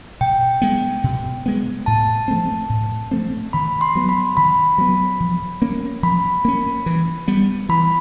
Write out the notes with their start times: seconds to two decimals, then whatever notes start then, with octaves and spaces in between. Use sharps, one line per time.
0.21 B2 G5
0.62 G#3 B3
1.04 B2
1.46 G#3 B3
1.86 A2 A5
2.28 F3 A3 C4
2.69 A2
3.11 F3 A3 C4
3.53 D#3 B5
3.81 C6
3.95 F#3 B3
4.09 B5
4.37 D#3 B5
4.78 F#3 B3
5.20 F3
5.62 A#3 C#4
6.03 F3 B5
6.45 A#3 C#4
6.86 E3
7.28 G3 B3
7.69 E3 B5